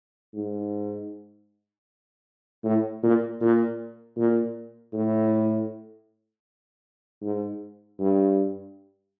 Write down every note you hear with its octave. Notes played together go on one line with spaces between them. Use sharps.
G#2
A2
A#2
A#2
A#2
A2
G#2
G2